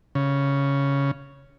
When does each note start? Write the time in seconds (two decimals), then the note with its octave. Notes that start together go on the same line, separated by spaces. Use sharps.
0.15 C#3